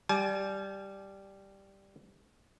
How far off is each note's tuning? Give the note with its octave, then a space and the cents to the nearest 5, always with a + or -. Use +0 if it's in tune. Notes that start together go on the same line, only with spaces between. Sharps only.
G3 +0 G#5 +40